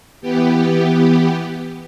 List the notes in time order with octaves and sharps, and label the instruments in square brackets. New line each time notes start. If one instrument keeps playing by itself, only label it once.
[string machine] E3 B3 G4